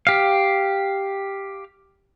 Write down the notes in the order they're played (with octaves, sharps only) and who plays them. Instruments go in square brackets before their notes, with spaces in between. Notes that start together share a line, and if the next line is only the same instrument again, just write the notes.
[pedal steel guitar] G4 F5